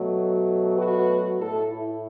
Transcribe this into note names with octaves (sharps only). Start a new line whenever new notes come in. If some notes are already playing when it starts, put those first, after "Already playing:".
Already playing: B2 F#3 A3
F#4 B4
A2 A3 E4 A4
E4